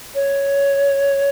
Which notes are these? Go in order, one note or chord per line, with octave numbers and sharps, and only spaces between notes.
C#5